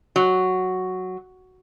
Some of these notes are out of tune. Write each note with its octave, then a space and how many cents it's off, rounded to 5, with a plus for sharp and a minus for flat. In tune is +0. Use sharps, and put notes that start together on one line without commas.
F#3 +0